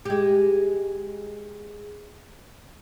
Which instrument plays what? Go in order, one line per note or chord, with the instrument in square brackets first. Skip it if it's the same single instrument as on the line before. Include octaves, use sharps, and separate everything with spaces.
[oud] G#3 G4